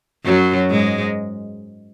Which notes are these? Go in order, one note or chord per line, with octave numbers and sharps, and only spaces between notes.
F#2 F#3
G#2 G#3